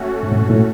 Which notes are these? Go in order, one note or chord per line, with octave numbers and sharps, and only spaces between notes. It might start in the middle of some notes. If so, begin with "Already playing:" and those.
Already playing: A3 C#4 F#4
G#2
A2
G#2
A2